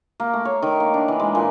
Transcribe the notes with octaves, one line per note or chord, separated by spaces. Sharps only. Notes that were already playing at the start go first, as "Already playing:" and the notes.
A#3
A3
C#5
D#3
A#3
D4
E3
G#3
A#2